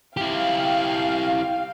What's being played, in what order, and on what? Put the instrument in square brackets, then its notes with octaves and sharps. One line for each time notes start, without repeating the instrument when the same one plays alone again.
[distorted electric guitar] E4 G4 [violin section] F5 G5